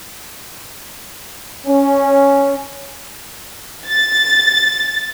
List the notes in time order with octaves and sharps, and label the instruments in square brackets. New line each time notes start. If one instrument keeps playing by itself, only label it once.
[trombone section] C#4
[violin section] A6